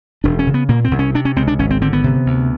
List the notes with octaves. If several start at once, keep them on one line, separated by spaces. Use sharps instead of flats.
E1 D4
C#4
C#3
B3
A#2 A#3
C4
C2
C#4
C3 D4
C#4
C#2 C4
D4
G#1 C#4
C4
D3 C4
B3
C3
D2